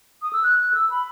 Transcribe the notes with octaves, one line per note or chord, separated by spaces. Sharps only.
D#6
E6
F#6
F#6
E6
B5